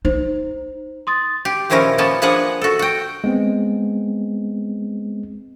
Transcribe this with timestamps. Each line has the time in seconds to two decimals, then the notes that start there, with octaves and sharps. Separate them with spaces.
0.05 D#4 C5
1.07 C6 D#6 A6
1.45 G4
1.70 A#2 D#3 F3 C#4 E4 A#4
1.98 F3 A#3 B3 C#4 A5
2.22 F3 A#3 D4 G#4 B4 F#5
2.62 F#4 A4
2.79 F#4 G5
3.24 G#3 B3 C4